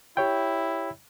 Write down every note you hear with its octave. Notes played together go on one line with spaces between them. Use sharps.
E4 G4 C#5 G5